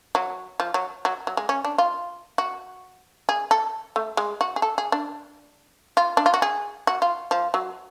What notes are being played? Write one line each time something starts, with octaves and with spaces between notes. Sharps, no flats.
F#3
F3
F#3
F#3
F#3
G#3
C#4
D4
F4
F#4
G#4
A4
A3
G#3
F#4
G#4
A4
G#4
D4
F4
D4
F4
F#4
G#4
F#4
F4
F3
F#3